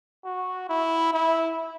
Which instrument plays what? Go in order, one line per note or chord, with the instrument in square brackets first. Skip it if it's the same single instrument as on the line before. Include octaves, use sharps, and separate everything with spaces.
[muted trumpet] F#4
E4
E4